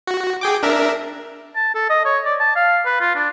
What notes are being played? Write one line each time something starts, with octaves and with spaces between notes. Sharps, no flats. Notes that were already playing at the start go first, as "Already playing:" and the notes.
F#4
G#4 G5 D6
D4 A#4 E5
A5
A4
D#5
C#5
D5
A5
F5
B4
F4
D4